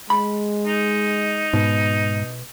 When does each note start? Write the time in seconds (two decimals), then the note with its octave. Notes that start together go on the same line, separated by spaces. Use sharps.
0.10 G#3 B5
0.66 D#4
1.54 G#2 B2